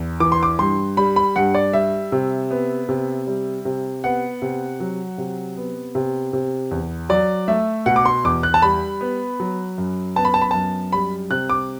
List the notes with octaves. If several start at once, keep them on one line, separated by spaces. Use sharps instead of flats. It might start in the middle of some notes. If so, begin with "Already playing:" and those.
Already playing: E2
E3 D6
C6
D6
G2 C6
G3 B5
B5
G2 F#5
D5
G3 E5
C3
B3
C3
G3
C3
B3 F#5
C3
F#3
C3
B3
C3
C3
E2
F#3 D5
A3 E5
B2 F#5
D6
C6
E2 D6
F#6
A5
G3 B5
B3
F#3
F#2
B3 A5
B5
A5
B5
F#2 A5
G3 B5
C3 F#6
D6